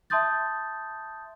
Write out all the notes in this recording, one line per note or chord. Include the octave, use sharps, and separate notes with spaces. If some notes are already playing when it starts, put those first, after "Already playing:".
E5 A5 C6 D#6 G6 A6